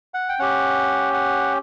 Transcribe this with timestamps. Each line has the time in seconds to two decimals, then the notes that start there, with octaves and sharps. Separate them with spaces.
0.14 F#5
0.29 G5
0.39 C#4 G4 F#5
1.13 F#5